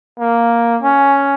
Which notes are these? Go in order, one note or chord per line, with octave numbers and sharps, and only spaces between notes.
A#3
C#4